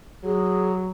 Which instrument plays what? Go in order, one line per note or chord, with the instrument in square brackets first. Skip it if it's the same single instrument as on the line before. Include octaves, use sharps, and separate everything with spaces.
[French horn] F#3 [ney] G#4